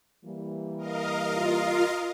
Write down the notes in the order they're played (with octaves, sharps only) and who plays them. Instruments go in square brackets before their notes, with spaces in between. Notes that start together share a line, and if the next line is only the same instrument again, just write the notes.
[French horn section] E3 G3 A#3
[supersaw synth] A#4 D#5 F5
[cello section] F4